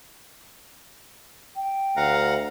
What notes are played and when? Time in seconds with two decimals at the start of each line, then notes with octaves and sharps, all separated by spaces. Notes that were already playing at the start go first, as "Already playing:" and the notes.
1.56 G5
1.97 D2 F5 F#5 A#5